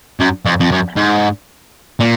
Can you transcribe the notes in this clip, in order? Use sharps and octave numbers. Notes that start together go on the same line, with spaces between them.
F#2
F2
F2
F#2
G#2
A#2